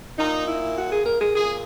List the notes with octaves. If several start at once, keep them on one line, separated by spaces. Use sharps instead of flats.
A#2 D#4
E4
F#4
G#4
A#4
G#4
A#2 G#4